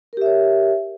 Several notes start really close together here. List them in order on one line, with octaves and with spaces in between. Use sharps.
A#4 G4 E5 C#5